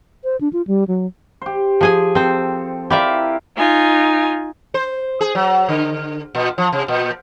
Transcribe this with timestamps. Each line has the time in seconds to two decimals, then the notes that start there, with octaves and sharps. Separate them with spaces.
0.24 C5
0.41 D4
0.53 F4
0.67 G3
0.88 F#3
1.42 G4 C5
1.81 F3 G#4 G#5
2.15 C4 A4 C5
2.90 E4 F4 G4 A#4 D5 E5
3.57 D#4 F4 G#5
4.74 C5
5.21 G#4
5.35 F#3
5.69 D3
6.35 A#2
6.58 F3
6.72 C3
6.88 A#2